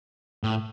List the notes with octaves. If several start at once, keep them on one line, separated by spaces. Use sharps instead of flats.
A2